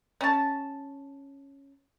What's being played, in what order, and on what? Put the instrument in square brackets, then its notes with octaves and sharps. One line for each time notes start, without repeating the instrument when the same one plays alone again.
[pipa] C#4 A5